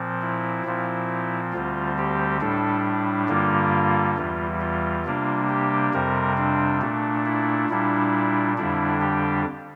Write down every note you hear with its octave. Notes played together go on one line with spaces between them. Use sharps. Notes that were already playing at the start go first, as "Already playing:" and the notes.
Already playing: A#2 F3 C4
E4
A#2 F3 C4
D2 D3 G3 C4 F4
G4
A2 G3 D4 A4
G2 D3 G3 A#3 F4
E2 E3 G3
F4
C3 G3 A#3 D4
G4
F2 C3 G3 C4 A#4
D4
A#2 A3 D4
E4
A#2 G3 D4 E4
F2 D3 G3 D4 E4
G4